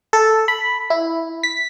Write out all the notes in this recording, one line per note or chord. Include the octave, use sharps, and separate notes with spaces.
A4
B5
E4
B6